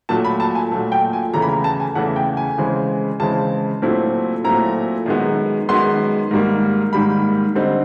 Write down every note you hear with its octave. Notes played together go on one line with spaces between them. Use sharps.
A#2 F#3 A3 A5
B5
A5
G#5
A#2 F#3 A3
G5
G#5
E2 C#3 E3 A3 A#5
B5
A#5
A5
G#5
E2 C#3 E3 A3 F#5
G5
G#5
C#3 E3 G#3 C4
C#3 E3 G#3 C4 A5
A#2 F#3 A3 C4 E4
A#2 F#3 A3 C4 E4 A#5
F#2 D#3 G#3 B3
F#2 D#3 G#3 B3 C6
G#2 D#3 G3 A#3
G#2 D#3 G3 A#3 B5
D3 G3 C4 D#4